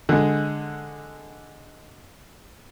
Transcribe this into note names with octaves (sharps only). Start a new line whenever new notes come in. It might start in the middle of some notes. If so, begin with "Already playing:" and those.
D3 G#3